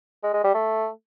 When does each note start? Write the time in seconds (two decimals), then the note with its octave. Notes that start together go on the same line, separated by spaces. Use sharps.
0.23 G#3
0.33 G#3
0.44 G3
0.54 A3